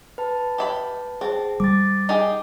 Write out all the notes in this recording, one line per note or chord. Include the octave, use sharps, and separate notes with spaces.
B4 A5
G4 E5 B5
C4 G#4 A5
G3 D6 A6
D#4 G4 G#4 D6